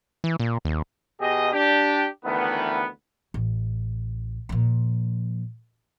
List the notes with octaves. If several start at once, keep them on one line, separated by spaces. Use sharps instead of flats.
E3
A#2
D#2
B2 G4 G#4 D#5
D4 G4
D2 D#3 E3 B3
A1
A#2 F3